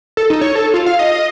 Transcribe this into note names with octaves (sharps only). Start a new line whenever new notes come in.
A4
D#4
C#5
A4
F4
F5
D#5
D#5